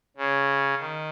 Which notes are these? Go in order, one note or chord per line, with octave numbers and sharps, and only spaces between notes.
C#3
D#3